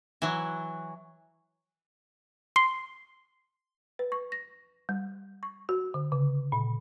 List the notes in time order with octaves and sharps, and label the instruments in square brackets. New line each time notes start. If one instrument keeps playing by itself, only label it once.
[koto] E3 F#3
[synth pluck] C6
[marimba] B4
C#6
A#6
G3
C#6
F#4
D3
C#3
A#2